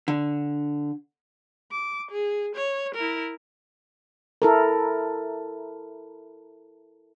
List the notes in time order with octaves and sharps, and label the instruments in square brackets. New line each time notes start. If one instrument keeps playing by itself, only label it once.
[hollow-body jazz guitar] D3
[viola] D6
G#4
C#5
E4 A#4
[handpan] E4 A4 A#4